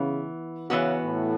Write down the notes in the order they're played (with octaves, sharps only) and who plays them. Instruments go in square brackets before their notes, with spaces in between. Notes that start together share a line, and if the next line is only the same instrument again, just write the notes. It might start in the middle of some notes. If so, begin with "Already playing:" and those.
Already playing: [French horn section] C#3 [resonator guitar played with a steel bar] E3 B3
[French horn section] C#3 [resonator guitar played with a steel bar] E3 B3 F#4
[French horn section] A2